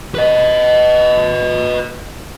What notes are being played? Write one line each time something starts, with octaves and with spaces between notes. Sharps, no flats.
B4 D#5